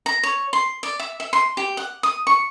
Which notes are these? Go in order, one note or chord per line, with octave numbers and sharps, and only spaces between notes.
A#5
C#5
C6
D5
E5
E5
C6
G4
F#5
D#6
C#6